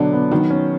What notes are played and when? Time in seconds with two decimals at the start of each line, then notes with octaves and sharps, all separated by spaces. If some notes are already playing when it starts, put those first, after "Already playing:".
Already playing: B2 D3 F#3 B3 D4
0.13 B3
0.32 D#3 F#3
0.50 C#4